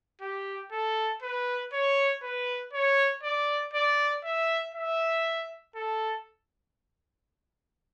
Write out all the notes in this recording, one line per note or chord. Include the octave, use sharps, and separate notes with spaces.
G4
A4
B4
C#5
B4
C#5
D5
D5
E5
E5
A4